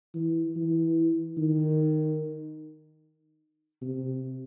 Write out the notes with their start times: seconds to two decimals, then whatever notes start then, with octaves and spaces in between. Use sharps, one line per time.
0.14 E3
0.56 E3
1.37 D#3
3.82 C3